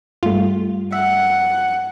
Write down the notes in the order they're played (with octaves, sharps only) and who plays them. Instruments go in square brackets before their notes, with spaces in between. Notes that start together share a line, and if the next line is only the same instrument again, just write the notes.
[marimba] G2 G3 [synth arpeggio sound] A3 F4
[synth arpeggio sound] E5 [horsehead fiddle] F#5